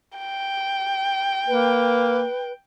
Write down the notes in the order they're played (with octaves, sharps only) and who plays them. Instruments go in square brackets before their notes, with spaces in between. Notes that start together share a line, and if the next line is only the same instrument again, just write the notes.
[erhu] G5
[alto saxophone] A#3 [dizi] B4